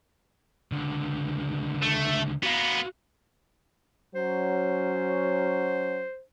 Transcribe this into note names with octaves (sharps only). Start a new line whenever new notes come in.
C#2 D3
A3
A#3 B3 F#4 F5
F#3 C#4 C5